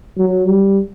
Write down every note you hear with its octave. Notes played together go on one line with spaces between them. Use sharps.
F#3
G3